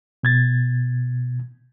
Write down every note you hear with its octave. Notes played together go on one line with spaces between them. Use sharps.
B2 G#6 A6